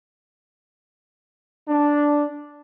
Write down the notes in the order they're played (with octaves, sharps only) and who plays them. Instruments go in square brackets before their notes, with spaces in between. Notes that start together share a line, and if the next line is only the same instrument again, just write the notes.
[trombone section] D4